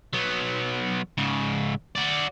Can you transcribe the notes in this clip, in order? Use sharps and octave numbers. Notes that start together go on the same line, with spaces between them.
F#3 B3
G#2 C#3
F#4 D5